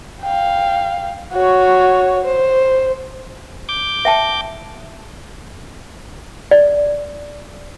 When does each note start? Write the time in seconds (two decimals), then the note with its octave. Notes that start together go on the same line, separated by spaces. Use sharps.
0.22 F5 G5
1.33 F#4 C#5
2.24 C5
3.69 D6 G6
4.05 E5 G5 A5
6.51 D5